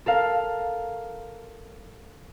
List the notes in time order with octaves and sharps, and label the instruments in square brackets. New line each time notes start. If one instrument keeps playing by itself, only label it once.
[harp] A4 A#4 F5